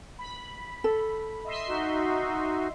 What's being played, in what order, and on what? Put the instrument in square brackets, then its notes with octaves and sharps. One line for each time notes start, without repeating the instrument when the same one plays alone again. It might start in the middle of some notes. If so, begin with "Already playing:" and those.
[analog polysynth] B5
[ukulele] A4
[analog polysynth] D#5 E5 C6
[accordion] D#4 F#4